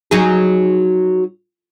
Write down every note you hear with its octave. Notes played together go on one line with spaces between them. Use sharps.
F#3 D#4 G#4